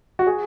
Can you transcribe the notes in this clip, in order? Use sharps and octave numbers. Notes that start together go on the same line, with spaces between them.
F#4
G#4